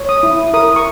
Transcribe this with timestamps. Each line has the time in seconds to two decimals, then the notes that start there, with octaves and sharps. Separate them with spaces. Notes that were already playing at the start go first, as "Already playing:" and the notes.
Already playing: C#5
0.09 D#6
0.23 E4
0.54 A#4 D#6
0.76 C#6